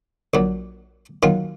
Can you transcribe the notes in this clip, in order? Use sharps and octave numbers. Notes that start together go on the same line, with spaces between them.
A#1 A#2 F#3
D#2 D#3 F#3 F4